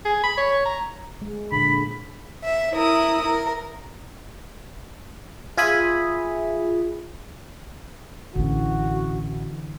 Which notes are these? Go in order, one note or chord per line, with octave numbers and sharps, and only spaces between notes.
G#4
B5
C#5
A#5
G#3
A#2 D3 B5
E5
E4 A#4 D#6
A#4
F4 G#4 E5 G#5 B5 D#6
A1 D3 E3 C#4 F#4